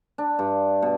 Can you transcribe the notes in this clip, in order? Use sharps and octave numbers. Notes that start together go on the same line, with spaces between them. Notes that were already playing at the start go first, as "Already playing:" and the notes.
D4
G2
B2